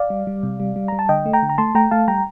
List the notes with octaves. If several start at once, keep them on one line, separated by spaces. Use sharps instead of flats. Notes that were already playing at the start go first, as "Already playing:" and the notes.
Already playing: D5 F5
G3
G3
C3
G3
G3
G3 A#5
A5
D3 D#5 G5
A3
G5 A#5
D3
A#5
A3 A5 C6
A3 G5 A#5
A3 F5 A5
G3 G5 A#5